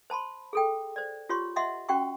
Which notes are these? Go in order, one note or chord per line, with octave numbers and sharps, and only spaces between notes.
C5 A5 B5 C6
G#4 A4 G5
C5 D5
F4 G4 C#5 C6 C#6
D#5 E5 F#5 C6
C#4 F#4 F#5 G5 C#6